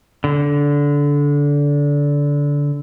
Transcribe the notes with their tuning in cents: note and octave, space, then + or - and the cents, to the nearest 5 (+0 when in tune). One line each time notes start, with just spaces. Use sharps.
D3 -20